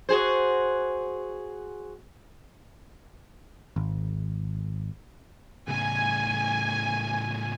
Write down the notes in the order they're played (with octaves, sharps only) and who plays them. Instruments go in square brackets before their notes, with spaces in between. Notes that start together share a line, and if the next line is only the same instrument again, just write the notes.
[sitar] F#4 G#4 C5
[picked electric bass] G#1
[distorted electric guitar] A2 C#3 [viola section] G#5